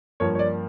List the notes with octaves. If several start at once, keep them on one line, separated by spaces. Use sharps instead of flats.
G2 F3 A#3 C#5
C#5
D5